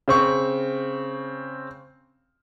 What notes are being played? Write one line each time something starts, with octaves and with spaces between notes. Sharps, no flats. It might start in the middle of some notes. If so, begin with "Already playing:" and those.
C#3 C4 C#6